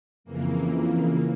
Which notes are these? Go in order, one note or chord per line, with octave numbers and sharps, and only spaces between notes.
F2 C#3 E3 A#3
A#3